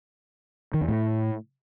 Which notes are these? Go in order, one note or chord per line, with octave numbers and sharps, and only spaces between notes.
D#3
E2
A2